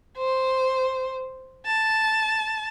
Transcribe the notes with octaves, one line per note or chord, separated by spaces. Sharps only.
C5
A5